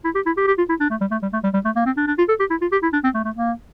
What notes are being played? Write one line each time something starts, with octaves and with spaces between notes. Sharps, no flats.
E4
G4
E4
G4
G4
F4
E4
D4
A3
G3
A3
G3
A3
G3
G3
A3
A#3
C4
D4
D4
F4
A4
G4
E4
F4
G4
E4
D4
C4
A3
A3
A#3